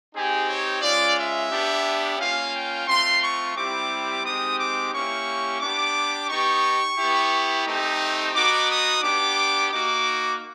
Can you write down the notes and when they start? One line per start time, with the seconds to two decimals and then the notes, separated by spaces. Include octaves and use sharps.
0.13 C4 D#4 G4 G#4
0.47 C#5
0.82 G#3 C#4 F4 D5
1.16 E5
1.51 B3 D4 G4
2.18 A#3 C#4 F4 F5
2.53 G5
2.87 A3 C4 F4 C6
3.21 C#6
3.55 G3 C4 E4 G4 D6
4.24 G#3 C4 D#4 G4 D#6
4.58 D6
4.92 A#3 C#4 E4 G4 C#6
5.60 B3 D4 G4 D6
6.28 B3 D#4 G4 C#6
6.97 B3 E4 G4
7.66 A3 C4 D#4 G4
8.34 B3 D#4 F#4 D6
8.69 D#6
9.02 B3 D4 G4 D6
9.70 A#3 D#4 F#4 D6